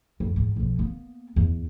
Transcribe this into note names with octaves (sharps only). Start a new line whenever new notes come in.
F2
D#2 G#2
B1 F3
A#3 B3
E2